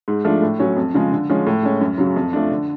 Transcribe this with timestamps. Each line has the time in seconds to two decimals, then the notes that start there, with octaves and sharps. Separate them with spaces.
0.08 G#2
0.25 F3 A3 D4
0.42 A2
0.60 F#3 C#4
0.76 F2
0.94 C#3 F3 G#3
1.12 D3
1.30 F3 G#3 C#4
1.47 A2
1.63 G#3 C#4
1.81 F#2
1.98 C#3 F#3
2.16 F2
2.33 F3 A3 D4
2.51 D3